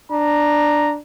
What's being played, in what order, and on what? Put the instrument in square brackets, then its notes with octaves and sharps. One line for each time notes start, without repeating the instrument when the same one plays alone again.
[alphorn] D4 [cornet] A#5